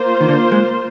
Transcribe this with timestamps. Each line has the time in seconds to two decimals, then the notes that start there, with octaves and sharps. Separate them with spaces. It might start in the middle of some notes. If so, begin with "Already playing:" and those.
Already playing: A#3 F4 C5
0.21 D#3
0.28 D3
0.52 G#3